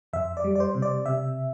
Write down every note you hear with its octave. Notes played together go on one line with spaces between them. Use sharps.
F2 E5
D5
G3
D5
C5
C3
D5
C3 E5